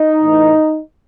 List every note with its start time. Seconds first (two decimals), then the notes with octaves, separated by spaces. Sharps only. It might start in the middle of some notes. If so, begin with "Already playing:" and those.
Already playing: D#4
0.22 A2 E3